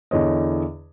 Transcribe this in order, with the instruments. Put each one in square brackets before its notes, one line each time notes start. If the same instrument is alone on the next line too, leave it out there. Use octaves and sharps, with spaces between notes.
[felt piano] E2 D3 C#5 D#5